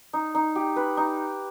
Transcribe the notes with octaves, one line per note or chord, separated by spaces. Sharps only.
D#4
D#4
G4
B4
D#4